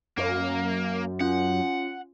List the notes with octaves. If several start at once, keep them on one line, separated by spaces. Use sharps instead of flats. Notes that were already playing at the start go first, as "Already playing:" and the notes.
F#2 A#3
C#4 F4 F#5